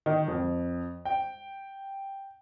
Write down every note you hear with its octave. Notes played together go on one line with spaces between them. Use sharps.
D#3
F2
G5